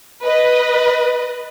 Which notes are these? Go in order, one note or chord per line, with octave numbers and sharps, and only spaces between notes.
B4 D#5